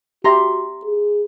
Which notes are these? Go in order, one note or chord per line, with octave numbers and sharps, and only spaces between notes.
F#4 G4 E5 A#5 C6 A#6
G#4